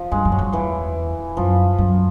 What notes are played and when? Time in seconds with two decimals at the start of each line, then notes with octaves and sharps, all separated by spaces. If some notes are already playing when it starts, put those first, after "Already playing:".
Already playing: F3
0.11 G2 G#3
0.25 F#2
0.32 F#3
0.39 F2
0.53 E2 E3
1.37 F#2 F3
1.78 F#2